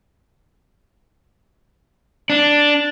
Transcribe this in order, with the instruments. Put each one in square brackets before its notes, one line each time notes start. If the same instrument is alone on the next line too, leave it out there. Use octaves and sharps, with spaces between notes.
[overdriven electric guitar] D4